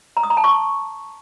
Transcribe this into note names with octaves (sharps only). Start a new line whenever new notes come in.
A#5
D#6
A#5
A5
C#6